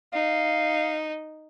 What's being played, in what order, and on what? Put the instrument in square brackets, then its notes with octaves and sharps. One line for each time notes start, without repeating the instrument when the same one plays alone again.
[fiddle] D#4 [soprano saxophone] F5